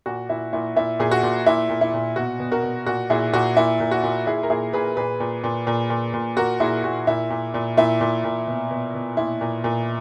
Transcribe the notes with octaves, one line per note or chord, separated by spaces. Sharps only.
A#2 F#4
A#2 E4
A#2 E4
A#2 E4
A#2 G#4
F#4
A#2
A#2 E4
A#2
E4
A#2
B2 F#4
B2
F#4 A#4
B2
A#2 F#4
A#2 E4 G#4
A#2 F#4
A#2 E4
A#2
F#4
A#2
A#2 E4 G#4
A#4
A#2 E4 G#4
A#2 G#4 B4
A#2 G#4 B4
A#2
A#2
A#2
A#2
A#2
A#2 F#4 A#4
A#2 E4 G#4
A#2 F#4
A#2 E4
A#2
A#2
A#2 E4
A#2
A#2
B2
B2
B2
A#2 E4
A#2
A#2